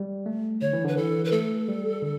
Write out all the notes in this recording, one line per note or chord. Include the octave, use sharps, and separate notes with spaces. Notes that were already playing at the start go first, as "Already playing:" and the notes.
Already playing: G3
A3
D3 C#5
E3
D3 B4
E3 A4
B4
A3 A4
G3
D3